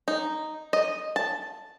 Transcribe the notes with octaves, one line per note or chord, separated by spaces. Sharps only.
D#4
D#5
A5